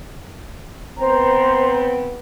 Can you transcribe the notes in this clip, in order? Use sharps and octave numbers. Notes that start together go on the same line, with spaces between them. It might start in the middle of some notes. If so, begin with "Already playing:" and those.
B3 C4 B4 C5 A#5